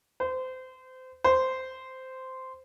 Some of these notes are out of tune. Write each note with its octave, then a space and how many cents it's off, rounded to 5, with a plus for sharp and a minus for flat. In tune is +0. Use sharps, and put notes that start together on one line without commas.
C5 -25
C5 -10